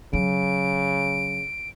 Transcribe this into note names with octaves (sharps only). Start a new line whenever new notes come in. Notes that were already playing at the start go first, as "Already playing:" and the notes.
C#3 F#3 D7